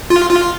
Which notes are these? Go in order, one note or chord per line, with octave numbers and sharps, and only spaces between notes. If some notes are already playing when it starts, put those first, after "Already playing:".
F4
F4